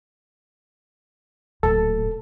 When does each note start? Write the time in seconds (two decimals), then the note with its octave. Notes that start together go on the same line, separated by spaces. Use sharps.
1.63 D1 A#2 A4